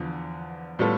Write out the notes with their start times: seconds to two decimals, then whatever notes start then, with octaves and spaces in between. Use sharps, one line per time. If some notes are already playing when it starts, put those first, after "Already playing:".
Already playing: E2 D3 F3 B3
0.79 A2 G3 B3 F4 A4